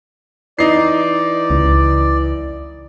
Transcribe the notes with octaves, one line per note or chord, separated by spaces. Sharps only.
E3 D#4 D5 C7
C#2